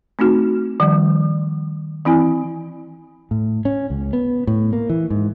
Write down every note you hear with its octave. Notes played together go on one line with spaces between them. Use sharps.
A3 C4 D#4 F#4
D#3 F3 G3
E3 C4 E4 G#5
A2
C#4
C#2
B3
A2
A#3
E3
G#2